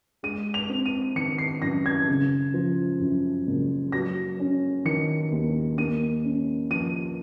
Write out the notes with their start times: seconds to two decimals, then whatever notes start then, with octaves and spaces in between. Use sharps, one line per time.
0.23 G#3 D#7
0.54 F7
0.69 C4
0.86 D#7
1.15 D#3 C#7
1.38 C7
1.62 F#2 A#6
1.86 G#6
2.08 C#3
2.54 F3
3.00 F#2
3.47 F#1
3.92 F#3 A#6
4.40 C#4
4.85 D#3 C#7
5.32 D#2
5.77 A#3 D#7
6.24 C#4
6.70 F3 D#7